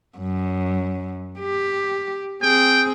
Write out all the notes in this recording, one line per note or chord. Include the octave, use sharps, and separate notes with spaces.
F#2
G4
C4 G#4 G5